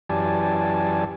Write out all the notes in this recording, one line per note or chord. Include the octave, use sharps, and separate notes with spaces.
F#2 E3 G4 D5 G#5 A5